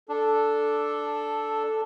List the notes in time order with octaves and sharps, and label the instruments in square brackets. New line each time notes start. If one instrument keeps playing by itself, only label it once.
[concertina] D4 [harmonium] A4